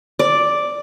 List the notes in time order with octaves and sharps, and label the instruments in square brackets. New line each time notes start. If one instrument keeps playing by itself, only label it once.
[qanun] D5